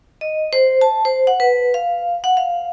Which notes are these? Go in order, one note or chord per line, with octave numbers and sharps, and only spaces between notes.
D#5
C5
A5
C5
F#5
B4
F5
F#5
F5